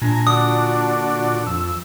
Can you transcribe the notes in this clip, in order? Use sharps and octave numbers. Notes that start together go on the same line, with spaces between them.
A#2 D4 G#5 A#5
D3 F#4 D5 D#6
F2 E6